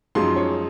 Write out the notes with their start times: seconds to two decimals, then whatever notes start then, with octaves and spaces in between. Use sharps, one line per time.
0.15 F#2 F3 G#3 D#4 C6
0.36 C#5